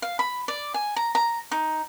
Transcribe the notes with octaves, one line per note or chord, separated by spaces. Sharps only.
F5
B5
D5
G#5
A#5
A#5
D#4